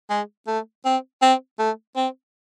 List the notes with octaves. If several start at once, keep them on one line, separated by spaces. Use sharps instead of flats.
G#3
A3
C4
C4
A3
C4